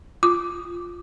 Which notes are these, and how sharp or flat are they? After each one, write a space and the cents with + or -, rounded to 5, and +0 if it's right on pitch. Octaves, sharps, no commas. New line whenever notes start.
F4 +0 D6 +0